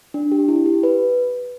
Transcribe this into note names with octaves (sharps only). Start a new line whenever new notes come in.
D4
G4
E4
G4
B4